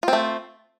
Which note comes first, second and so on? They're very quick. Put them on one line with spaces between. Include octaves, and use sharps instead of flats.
F4 C4 A3